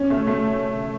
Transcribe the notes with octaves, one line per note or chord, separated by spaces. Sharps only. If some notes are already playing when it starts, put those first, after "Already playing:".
Already playing: C#4
A3
A3